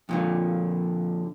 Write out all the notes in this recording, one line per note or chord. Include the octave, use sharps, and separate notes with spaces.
F2 A#2 D3